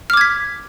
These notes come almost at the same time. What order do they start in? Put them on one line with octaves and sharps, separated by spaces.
F6 D6 G#6 B6